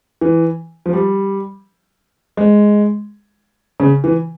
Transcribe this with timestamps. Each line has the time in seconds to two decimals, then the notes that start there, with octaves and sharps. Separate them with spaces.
0.21 E3
0.86 F3
0.93 G3
2.37 G#3
3.80 C#3
4.04 E3